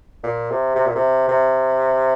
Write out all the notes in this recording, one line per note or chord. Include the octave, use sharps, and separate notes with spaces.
A#2
C3
C3
A#2
C3
C3